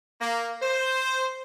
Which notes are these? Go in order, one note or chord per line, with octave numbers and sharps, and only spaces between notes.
A#3
C5